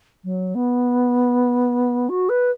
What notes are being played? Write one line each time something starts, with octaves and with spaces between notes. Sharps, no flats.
F#3
B3
F#4
B4